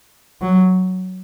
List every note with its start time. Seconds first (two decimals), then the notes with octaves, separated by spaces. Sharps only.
0.41 F#3